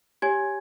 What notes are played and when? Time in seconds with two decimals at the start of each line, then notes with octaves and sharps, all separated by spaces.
0.22 G4 C#5 G#5 G#6